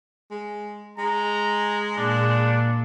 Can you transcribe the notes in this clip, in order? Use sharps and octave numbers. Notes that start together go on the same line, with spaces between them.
G#3
G#3 A#5
A#2 D4